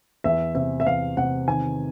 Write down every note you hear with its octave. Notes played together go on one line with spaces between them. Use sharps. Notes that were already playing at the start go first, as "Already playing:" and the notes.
E2 E5
C3 E5
E5
E2 F5
C3 F#5
D#3 G#5